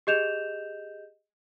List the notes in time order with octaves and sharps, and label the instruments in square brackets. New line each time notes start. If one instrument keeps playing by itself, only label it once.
[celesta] G4 G#4 D#5 G6 E7 F7